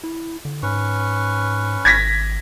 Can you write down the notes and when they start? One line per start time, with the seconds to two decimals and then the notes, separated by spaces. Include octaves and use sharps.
0.04 E4
0.45 D3
0.63 G#2 C#4 B4 C#6
1.85 G#1 G#6 A#6 B6